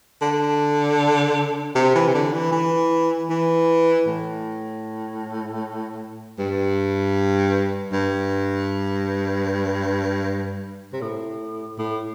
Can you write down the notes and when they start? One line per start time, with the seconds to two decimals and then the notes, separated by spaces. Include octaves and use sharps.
0.22 D3
1.75 C3
1.95 E3
2.08 C3
2.14 D3
2.33 E3
2.52 E3
3.30 E3
4.07 A2
6.39 G2
7.92 G2
10.92 C3
11.01 A2
11.78 A2